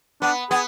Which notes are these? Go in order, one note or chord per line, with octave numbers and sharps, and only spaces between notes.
B3 D4
B3 G#4